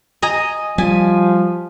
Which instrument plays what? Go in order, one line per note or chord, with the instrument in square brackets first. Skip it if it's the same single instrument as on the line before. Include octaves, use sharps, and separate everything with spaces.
[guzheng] D#5 G#5 A#5
[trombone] F3 [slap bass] G3 [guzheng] G#5